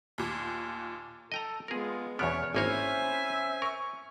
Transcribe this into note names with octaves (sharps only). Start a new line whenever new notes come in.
D#2 A#2
A4 D#5 G5 A#5
G#3 B3 F4 G#4 A#4
E2 B2 B3 C#4 C#5 F6 D7
G#1 A#3 C#4 E4 C5 C#5 E5 G#5
A#4 C#6